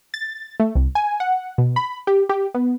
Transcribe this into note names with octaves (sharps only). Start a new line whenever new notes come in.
A6
A3
C2
G#5
F#5
B2
B5
G4
G4
B3